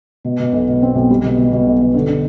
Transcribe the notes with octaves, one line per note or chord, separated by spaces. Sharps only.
B2
B2
B1
B2
C4
B1
G3
B2
B2
B2
B1
B2
D3
D3